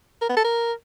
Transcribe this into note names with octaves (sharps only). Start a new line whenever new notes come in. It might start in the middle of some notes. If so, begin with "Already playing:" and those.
A#4
B3
A4
A#4